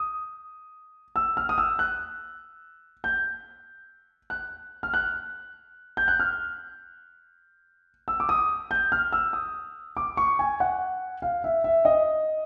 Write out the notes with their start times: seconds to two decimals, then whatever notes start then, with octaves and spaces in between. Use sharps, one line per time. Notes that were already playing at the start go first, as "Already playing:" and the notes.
Already playing: D#6
1.16 E6
1.37 F6
1.49 D#6
1.58 E6
1.79 F#6
3.04 G6
4.30 F#6
4.83 F6
4.94 F#6
5.97 G6
6.08 F#6
6.20 F6
8.08 E6
8.20 D6
8.29 D#6
8.71 G6
8.92 F6
9.12 E6
9.33 D#6
9.97 D6
10.17 C#6
10.39 G#5
10.60 F#5
11.22 F5
11.44 E5
11.64 E5
11.85 D#5